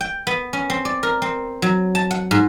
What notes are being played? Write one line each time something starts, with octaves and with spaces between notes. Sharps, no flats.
G5
B3
C#4
C4
D5
A#4
C4
F#3
A5
F#5
G#2